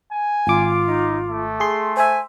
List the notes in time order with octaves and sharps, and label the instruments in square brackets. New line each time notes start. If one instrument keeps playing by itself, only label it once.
[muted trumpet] G#5
[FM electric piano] G#1 D6 [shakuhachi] F4
[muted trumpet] D#4
A3
[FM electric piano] G#4 C6
[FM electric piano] C5 E5 [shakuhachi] G#5